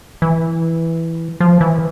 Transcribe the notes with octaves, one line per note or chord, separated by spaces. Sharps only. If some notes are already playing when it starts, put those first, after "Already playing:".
E3
F3
E3